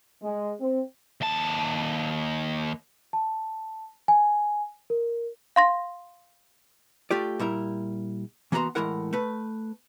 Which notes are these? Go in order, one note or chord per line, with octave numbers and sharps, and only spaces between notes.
G#3
C4
D#2 A5
A5
G#5
A#4
F5 C6 A#6
A3 F4 G4 D5
A#2 G3 E4 A#4
E3 A#3 B3 F#4 A#5 C6
A2 E3 G#3 E4 A#4 F#5
A3 B4